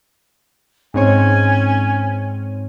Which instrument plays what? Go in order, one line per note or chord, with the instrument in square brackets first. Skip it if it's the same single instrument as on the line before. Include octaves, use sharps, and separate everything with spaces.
[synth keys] G#2 C4 C#5 [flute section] C#4 G#5